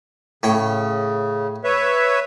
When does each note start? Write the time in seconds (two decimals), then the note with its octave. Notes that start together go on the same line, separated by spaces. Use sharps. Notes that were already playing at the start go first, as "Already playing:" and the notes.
0.43 A2 C#3 C#5 G5
1.64 B4 C#5 E5